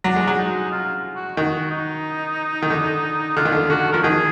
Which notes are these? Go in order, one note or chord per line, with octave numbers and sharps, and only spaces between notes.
F#3 D4
G#3
F#3
D#4
F4
F#4
D#3 F#4
D#4
D#3
D3
D3 F4
D#3
D3
D3 F#4
F3 A#4
D#3 G#4